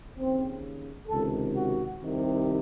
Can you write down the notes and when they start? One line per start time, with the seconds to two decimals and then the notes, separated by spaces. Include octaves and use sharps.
0.16 D#2 C#3 C4
1.08 C#2 C3 D#3 A4
1.55 F#4
2.00 C2 C3 D#3